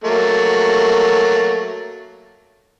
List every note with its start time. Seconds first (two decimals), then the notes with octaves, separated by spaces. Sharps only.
0.04 F#3 A3 A#3